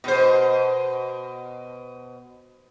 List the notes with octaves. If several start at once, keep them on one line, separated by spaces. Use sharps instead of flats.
B2 C5